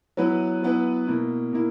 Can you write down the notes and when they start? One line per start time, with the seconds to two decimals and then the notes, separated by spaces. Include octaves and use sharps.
0.17 F#3 B3 E4 B4
0.63 F#3 B3 E4 B4
1.07 B2 A#3 E4
1.53 B2 A#3 E4